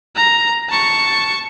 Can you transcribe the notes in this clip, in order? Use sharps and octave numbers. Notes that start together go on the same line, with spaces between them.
A#5
A5 C#6